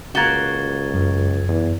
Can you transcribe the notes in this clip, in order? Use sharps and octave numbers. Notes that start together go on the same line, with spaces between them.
C#2 A#3 F#4 G#6 A6 G7
F#2
E2